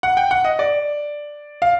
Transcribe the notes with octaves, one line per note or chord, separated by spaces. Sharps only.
F#5
G5
F#5
D#5
D5
F5